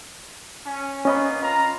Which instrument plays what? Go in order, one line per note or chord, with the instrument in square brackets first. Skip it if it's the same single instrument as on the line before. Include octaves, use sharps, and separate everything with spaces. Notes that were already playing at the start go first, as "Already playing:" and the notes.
[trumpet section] C#4
[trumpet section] A#3 B3 [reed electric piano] C#4 D#5 B5
[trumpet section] F4 A#5